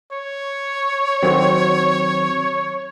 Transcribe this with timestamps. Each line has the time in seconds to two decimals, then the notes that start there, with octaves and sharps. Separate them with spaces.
0.12 C#5
1.23 D#3 F#3 C4